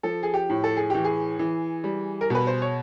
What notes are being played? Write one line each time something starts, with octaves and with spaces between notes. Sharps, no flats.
F3 A4
G#4
G4
A2
A4
G#4
E3 G4
G#4
E3
G3
A#4
B2 B4
C5
C#5